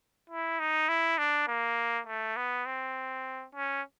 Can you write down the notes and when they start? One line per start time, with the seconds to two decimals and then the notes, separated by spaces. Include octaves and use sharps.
0.30 E4
0.60 D#4
0.89 E4
1.18 D4
1.47 A#3
2.07 A3
2.36 B3
2.66 C4
3.55 C#4